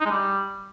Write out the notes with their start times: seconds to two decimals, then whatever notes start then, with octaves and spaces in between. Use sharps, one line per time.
0.01 D#4
0.06 G#3
0.11 G3